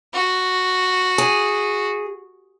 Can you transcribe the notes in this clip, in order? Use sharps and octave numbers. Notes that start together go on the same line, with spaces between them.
F#4
G#4